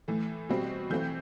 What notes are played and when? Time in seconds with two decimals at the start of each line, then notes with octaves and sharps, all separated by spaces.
0.08 A2 E3 A3
0.49 B2 G3 C4
0.90 E3 A3 C4 G6